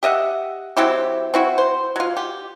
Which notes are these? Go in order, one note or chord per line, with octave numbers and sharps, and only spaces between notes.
G4 D#5 E5 F#5
F#3 C4 E4 G4
C4 E4 F#4
C5
F#3 F4
G4